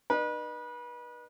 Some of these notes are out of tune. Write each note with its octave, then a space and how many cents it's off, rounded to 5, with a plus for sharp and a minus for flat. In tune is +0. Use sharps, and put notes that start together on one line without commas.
D#4 -40 B4 -35